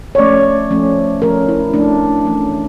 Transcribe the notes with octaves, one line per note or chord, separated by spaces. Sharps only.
C#5
F3 A3 C#4 D5
F3 A3 C#4
F3 A3 C#4 A#4
E4
F3 A3 C#4 D4
E3 A3 C#4